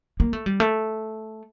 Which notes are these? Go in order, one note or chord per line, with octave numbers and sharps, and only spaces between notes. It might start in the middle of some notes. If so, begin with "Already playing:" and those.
A#3
A3
G3
A3